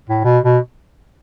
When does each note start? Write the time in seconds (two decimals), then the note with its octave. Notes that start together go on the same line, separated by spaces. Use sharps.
0.09 A2
0.24 B2
0.44 B2